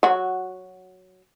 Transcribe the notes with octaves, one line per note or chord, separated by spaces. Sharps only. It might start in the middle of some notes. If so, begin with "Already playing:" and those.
F#3 F#4